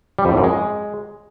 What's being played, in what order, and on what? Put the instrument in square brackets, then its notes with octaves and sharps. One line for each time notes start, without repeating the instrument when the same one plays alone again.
[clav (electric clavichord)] G3
F2
A2
F#2
G#3